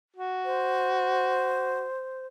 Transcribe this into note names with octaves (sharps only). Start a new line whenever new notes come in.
F#4
C5